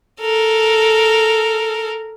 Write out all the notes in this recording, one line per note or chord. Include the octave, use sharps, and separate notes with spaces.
A4 A#4